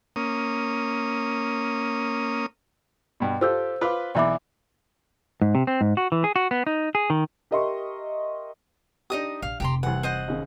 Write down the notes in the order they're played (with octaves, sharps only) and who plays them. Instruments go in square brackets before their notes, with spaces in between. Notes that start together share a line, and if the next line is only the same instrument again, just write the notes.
[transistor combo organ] A#3 C#4 D#6
[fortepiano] G2 B2
[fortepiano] F4 G4 A4 [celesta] C5 E6 G6
[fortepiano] F4 B4 D6
[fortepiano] B1 E3 B5 [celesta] D5 E5 D6
[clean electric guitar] G#2
C3
C4
G#2
F#4
E3
G#4
F#4
B3
D#4
G#4
D#3
[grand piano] G4 A#4 D#5 E5 C6 C#6
[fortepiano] D4 G4 [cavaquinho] D#4 D#5 D#6
[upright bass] A#1 [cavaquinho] F5
[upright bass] F1 C3 [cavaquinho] G4 A#5 C6
[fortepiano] C2 E3 [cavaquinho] F#5
[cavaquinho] C5 D#5 F#5
[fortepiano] D#2 C#3